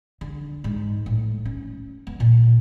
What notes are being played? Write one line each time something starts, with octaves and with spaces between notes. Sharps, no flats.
D3
G#2
A2
C#4
B3
A#2